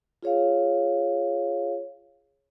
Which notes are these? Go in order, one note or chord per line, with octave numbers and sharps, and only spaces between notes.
F4 G#4 C#5 F5